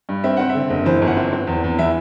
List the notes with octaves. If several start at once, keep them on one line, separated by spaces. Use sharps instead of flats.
G2
C4 E5
C4 F#5
E5
D3
F#1
E3 C5
G1
F#5
C4
C4
E2
E2
E3 E5